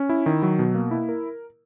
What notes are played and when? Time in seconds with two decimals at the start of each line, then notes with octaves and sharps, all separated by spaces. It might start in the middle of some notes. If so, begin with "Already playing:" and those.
Already playing: C#4
0.09 E4
0.26 D#3
0.43 F#3
0.59 B2
0.75 A#3
0.91 E4
1.09 A#4